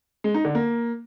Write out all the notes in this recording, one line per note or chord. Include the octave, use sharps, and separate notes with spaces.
G#3
D#4
D3
A#3